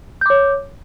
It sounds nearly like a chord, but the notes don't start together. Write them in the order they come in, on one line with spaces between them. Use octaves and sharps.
G6 D6 C#5